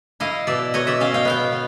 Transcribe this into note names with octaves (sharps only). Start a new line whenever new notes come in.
E4 D#5 F5
B2 D5 E5
B2 C#5 D#5
D5 E5
C#4 D#5 F5
F5 G5
B3 F5 G5
B3